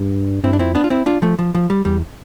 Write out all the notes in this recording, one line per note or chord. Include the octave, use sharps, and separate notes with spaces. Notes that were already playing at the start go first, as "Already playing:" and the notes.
Already playing: G2
G2 C4 E4
D4
F2 C4 E4
B3 D4
F4
C4 E4
D4 F4
F3 A3
F3
F3
G3
E2 G3